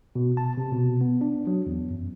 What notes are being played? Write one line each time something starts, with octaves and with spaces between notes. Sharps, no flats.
B2
A5
C3
B2
B3
D4
F#3
E2
F#2